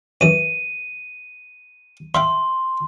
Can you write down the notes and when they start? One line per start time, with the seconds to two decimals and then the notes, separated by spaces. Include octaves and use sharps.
0.21 F#2 E3 D#7
2.15 E5 F5 G5 C6